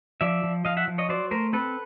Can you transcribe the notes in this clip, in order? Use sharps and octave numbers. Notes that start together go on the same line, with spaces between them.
F3 D5 E5
F3
F3 D#5 F5
E5 F#5
F3
C#5 D#5
F#3 C5 D5
A3 A#4 C5
C4 A4 B4